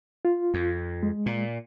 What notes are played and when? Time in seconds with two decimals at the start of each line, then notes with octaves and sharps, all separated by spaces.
0.25 F4
0.54 F2
1.03 G#3
1.26 A#2